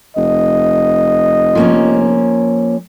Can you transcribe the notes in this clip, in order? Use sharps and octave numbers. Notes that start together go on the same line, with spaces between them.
F1 D#5
F3 A#3 C#4